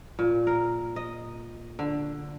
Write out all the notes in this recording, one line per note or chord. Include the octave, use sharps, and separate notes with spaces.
A#2
A#4
D#5
D3